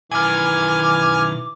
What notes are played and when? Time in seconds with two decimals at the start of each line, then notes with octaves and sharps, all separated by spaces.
0.12 B1 D#3 E3 G#5 D6 F6